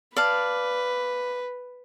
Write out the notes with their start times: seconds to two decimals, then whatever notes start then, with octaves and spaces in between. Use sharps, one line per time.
0.16 B4 D5 F5 A5